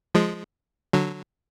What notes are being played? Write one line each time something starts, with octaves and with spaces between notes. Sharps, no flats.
F3 G#3
D3 F#3